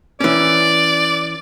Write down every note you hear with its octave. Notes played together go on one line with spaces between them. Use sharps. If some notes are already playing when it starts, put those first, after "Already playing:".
E3 C#4 D5